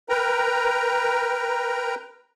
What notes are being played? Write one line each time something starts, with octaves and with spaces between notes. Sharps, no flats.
A#4 B4 G5 A#5